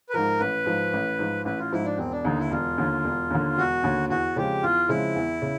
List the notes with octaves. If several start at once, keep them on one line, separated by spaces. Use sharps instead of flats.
B4
G#2 F3 A#4
A1 B4
G#2 F3
A1
G#2 F3
A1 B4
F4
G#2 F3 E4
D4
E1 C4
D4
D#2 D3 D#4
E4
E1 F4
D#2 D3
E1
D#2 D3
E1 F#4
D#2 D3
E2 F#4
C#3 F3 G#3 C4 G4
E2 F4
C#3 F3 G#3 C4 E4
E2
C#3